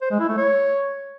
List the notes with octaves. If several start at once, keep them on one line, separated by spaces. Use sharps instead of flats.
C5
G#3
E4
A3
C#5